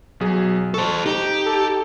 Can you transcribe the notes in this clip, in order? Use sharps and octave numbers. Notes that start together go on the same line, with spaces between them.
B1 F#3 G#4
A4 C5 A5 C#6
D#4 G4
A4